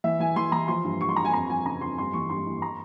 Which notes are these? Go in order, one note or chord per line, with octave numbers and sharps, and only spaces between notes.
E3 E5
E3 G#5
E3 C6
E3 A#5
F3 C6
G2
G2 C#6
C6
G2 A#5
G#5
F2 A#5
F3 G#5
C#3 A#5
F2 C6
G2 C6
E3 C#6
G2 C6
E3
A#5